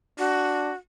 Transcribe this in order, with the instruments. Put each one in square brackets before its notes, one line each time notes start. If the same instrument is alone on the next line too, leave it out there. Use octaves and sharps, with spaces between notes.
[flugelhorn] D4 [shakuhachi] F#4